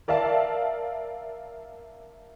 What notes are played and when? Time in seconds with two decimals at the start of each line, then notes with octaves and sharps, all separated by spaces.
0.08 A#4 D5 E5 F5 A5